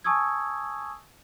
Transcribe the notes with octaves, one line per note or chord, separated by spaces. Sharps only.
G#5 A5 C#6 D#6 E6 G#6